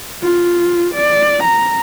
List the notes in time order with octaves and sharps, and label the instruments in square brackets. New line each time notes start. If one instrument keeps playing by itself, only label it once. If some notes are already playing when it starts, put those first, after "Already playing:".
[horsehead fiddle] F4
D5
A#5